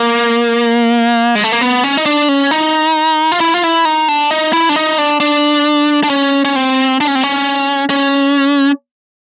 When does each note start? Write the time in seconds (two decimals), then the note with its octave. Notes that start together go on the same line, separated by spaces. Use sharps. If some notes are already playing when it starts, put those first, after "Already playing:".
Already playing: A#3
1.35 G#3
1.44 A3
1.52 A#3
1.61 B3
1.84 C#4
1.97 D#4
2.06 D4
2.29 C#4
2.51 D#4
3.32 F4
3.40 E4
3.54 F4
3.63 E4
3.85 D#4
4.08 D4
4.31 D#4
4.53 E4
4.69 D4
4.76 D#4
4.98 D4
5.20 D4
6.03 D4
6.10 C#4
6.45 C#4
6.56 C4
7.01 D4
7.08 C#4
7.15 C4
7.24 C#4
7.90 C#4